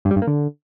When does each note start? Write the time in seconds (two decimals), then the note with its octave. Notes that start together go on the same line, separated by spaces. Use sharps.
0.05 G2
0.11 G3
0.16 G2
0.22 A#3
0.27 D3